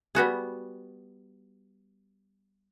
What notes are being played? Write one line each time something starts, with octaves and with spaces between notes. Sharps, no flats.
G3 B3 F#4 G#4